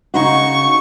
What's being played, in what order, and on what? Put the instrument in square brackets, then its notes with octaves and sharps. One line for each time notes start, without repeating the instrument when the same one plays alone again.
[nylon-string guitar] C#3 D#4 F#4 [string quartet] C#6